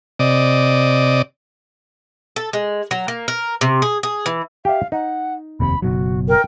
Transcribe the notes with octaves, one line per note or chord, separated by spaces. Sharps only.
C3 D5 D#5
A4
G#3
F#3
A#3
A#4
C3
G#4
G#4
E3
G4 E5 F5
D#4 F#5
F1 D#2 C3 B5
F#1 B2 F#3 F#4
A#4 G5